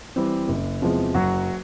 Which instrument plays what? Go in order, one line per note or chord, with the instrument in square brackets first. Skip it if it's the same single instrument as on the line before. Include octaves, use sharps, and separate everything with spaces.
[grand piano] E3 G3 C4
F#1
E2 C3 F3 G#3
F#1 F#3 F#4